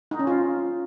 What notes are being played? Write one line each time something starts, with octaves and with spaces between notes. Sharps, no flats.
D#4
C#4
F4